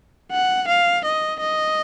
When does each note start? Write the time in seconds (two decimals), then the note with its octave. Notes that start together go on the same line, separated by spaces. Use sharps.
0.32 F#5
0.68 F5
1.04 D#5
1.39 D#5